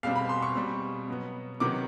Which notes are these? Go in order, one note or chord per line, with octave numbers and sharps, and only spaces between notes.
E2 B2 G3 C4 F5
B5
C6
C#6
B2 G3 C4
B2 F#3 B3
C3 D#3 F#3 B3 D6